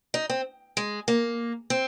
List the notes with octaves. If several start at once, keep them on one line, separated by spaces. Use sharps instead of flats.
D#4
C4
G#3
A#3
C4